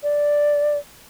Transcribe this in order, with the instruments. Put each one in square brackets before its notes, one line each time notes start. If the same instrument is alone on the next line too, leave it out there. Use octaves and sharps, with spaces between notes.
[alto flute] D5